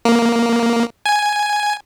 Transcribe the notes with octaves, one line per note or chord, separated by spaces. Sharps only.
A#3
G#5